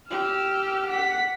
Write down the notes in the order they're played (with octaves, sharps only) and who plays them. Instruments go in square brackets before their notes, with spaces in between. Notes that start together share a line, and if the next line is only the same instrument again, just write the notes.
[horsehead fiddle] G4 [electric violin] E6 F6
[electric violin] F#5 B6